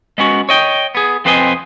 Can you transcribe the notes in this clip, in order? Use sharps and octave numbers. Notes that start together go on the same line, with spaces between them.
G#3 B3 C#4 F#4
C#5 D#5 G5
B3 G#4
F2 C4 B4 C5 D#5 G#5